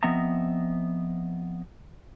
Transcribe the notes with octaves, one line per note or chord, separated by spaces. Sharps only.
F3 B3 C4 D#5 E5 A#5